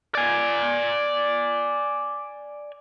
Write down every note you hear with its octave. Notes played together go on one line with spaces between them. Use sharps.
D5 G#5